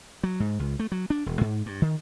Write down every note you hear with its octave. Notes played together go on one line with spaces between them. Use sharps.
F#3
G#2
C#2
A3
F#3
D4
E1
G#2
G2
D#3